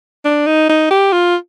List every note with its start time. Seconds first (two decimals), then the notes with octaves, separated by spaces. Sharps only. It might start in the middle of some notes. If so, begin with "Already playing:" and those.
0.25 D4
0.47 D#4
0.69 D#4
0.91 G4
1.13 F4